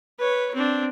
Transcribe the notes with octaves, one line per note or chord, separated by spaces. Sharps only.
B4 C#5
C4 D4